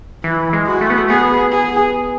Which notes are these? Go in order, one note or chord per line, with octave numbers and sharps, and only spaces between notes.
E3 E4
G#3
F#4
A3
B3
A3
B3 G#4
G#4